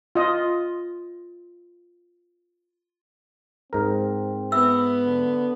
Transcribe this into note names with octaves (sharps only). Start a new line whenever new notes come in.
F4 D#5
G#2 C4 A#4
B3 E5 E6
D3